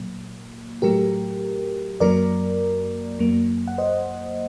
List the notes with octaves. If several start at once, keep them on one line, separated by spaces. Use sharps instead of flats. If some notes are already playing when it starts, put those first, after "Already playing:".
Already playing: A#2 F#3 A#3
A2 F#3 A3 G4 A#4
F#2 F#3 A#3 A#4 D5
F#2 F#3 A#3
F#5
C5 D#5